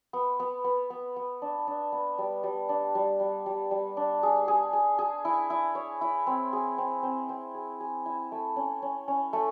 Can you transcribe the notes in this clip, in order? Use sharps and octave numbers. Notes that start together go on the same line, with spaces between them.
B3
B3
B3
B3
B3
D4
D4
B3
G3
G3
D4
G3
G3
G3
G3
D4
G#4
G#4
G#4
G#4
E4
E4
C#5
E4
C4
G#4
C4
C4
C4
G#4
G#4
E4
A3
C#4
C#4
C#4
A3